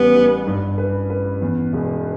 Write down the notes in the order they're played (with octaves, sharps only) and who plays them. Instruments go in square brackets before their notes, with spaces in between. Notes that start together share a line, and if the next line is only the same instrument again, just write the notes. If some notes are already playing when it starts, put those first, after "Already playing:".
Already playing: [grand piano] A1 G3 [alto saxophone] B3
[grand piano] G3
G2
B4
B4
E2
E1